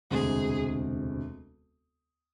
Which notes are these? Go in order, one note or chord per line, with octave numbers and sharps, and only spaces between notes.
E1 D2 C3 G#3 C4 G#4